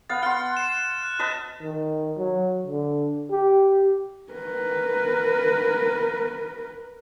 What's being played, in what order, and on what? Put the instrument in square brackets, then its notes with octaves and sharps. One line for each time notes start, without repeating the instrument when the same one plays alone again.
[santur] B3 F5 [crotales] A6
[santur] F#5 C6 [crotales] F6
[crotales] E7
F#6
[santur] B4 D#5 A5
[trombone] D#3
F#3
D3
G4
[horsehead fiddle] A#4 B4